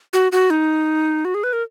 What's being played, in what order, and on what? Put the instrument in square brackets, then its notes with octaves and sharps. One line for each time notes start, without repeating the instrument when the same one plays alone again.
[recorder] F#4
F#4
D#4
F#4
G#4
B4
A#4